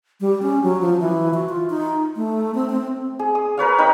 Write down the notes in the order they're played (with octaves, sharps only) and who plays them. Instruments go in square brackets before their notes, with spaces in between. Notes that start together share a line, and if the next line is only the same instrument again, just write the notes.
[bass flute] G3
C#4
F#3
F3
E3
F#4
F4
D#4
A3
C4
C4
[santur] G#4
D#6
A#4 B4 C#5 F5
C4 D#4 A#4 B5